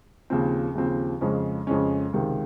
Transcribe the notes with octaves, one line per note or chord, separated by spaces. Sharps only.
D#2 C#3 F3 C4
D#2 C#3 F3 C4
F2 C#3 G#3 C#4
F2 C#3 G#3 C#4
C#2 C3 D#3